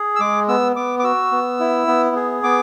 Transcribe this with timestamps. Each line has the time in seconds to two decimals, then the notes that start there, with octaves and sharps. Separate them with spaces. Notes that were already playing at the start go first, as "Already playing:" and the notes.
Already playing: G#4
0.16 E6
0.20 G#3 D6
0.48 B3 E6
0.76 B3 D6
0.99 D6
1.04 F#4 E6
1.31 B3
1.60 E4
1.87 B3
2.16 G#4
2.43 B3 D6